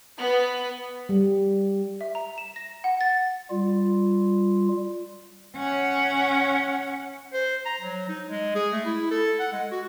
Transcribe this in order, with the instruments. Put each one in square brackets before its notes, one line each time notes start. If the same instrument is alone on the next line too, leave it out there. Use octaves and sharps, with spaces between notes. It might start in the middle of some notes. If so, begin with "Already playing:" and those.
[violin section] B3
[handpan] G3
[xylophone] E5
A#5
E7
A#6
F#5
A6
[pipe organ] G3 F4
[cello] C#4 F#5
[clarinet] C5
A#5
F#3
D#4
G#3
G#4
A3
E4
A4
F#5
G#3
F#4